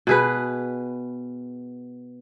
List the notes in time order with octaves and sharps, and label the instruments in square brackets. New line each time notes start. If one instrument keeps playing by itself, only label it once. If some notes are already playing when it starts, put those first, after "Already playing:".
[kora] B2 G#4 B4